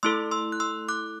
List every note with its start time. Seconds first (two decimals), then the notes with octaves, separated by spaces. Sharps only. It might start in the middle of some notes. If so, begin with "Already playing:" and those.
0.03 A3 E4 A4 C6 E6
0.31 C6 E6
0.52 F#6
0.60 C6 E6
0.89 D6 F#6